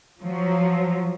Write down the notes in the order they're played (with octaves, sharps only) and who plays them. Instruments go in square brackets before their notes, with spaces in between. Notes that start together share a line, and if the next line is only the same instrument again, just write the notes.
[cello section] F3 F#3